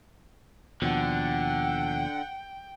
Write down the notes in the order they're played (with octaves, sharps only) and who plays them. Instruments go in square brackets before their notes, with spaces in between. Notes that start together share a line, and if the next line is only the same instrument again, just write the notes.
[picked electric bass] D#2 B2 F3 [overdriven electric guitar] D3 [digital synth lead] F#5 [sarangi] G5